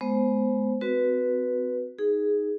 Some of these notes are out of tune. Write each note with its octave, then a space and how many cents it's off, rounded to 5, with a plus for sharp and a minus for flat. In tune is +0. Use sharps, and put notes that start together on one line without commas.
G#3 +25 B3 +0 C5 +0
C4 -35 F#4 +0 B4 +0
D#4 +0 G#4 +0